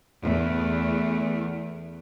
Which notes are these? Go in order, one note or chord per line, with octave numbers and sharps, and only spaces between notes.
E2 A3